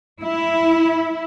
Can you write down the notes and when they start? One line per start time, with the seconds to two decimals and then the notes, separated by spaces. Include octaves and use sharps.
0.22 E4